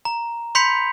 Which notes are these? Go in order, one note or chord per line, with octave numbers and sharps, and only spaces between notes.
A#5
B5 C6 G6 B6 C#7 F7